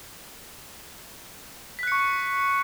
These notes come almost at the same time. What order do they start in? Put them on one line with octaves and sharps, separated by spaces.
B6 F#6 C#7 C#6